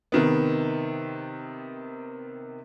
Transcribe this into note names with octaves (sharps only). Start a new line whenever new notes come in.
C3 D#3 B3